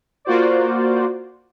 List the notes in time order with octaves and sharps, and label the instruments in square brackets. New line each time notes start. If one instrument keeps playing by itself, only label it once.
[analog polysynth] A#3 F4 F#4 C5 D5